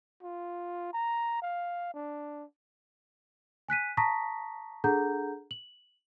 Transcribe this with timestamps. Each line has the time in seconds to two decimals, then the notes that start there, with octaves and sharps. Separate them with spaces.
0.23 F4
0.93 A#5
1.42 F5
1.94 D4
3.69 G#5 F#6 B6 D#7
3.97 A5 A#5 C#6 D#6 A#6 B6
4.84 D4 G#4 A4 F#5 A#5 G6
5.51 F#7